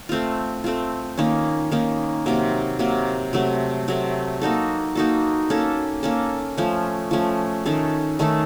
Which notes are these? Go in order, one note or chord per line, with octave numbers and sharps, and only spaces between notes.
A3 C4 F4
A3 C4 F4
D#3 A#3 C#4
D#3 A#3 C#4
C3 F#3 A#3
C3 F#3 A#3
C3 F#3 A3
C3 F#3 A3
A#3 D#4 F#4 A4
A#3 D#4 F#4 A4
A#3 C#4 A4
A#3 C#4 A4
F3 A3 C#4
F3 A3 C#4
D#3 A3 C#4 A4
D#3 A3 C#4 A4